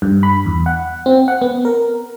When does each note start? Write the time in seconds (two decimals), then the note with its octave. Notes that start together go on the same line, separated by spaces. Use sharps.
0.02 G2
0.23 B5
0.46 E2
0.66 F#5
1.06 C4
1.28 F#5
1.42 B3
1.65 A#4